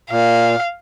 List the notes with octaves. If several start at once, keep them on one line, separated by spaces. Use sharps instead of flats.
A#2 F5